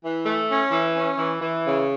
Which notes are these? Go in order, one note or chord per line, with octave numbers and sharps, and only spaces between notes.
E3
A3
C#4
E3
C#4
E3
E3
C#3